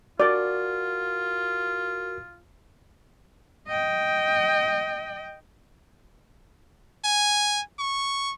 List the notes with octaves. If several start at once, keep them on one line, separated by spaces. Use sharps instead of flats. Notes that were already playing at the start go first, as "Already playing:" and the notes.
F4 F#4 A#4 D5
D#5 G5
G#5
C#6